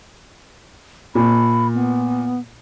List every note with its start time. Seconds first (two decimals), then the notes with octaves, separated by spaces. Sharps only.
1.15 A#2 B5
1.74 B3